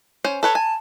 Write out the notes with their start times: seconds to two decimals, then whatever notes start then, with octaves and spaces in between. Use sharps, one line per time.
0.24 C#4 C5
0.43 A4 B4 C#5 A5
0.55 G#5